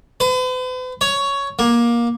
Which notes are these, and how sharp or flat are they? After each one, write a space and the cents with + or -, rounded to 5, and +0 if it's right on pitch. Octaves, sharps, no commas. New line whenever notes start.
B4 +45
C#5 +10
A#3 +20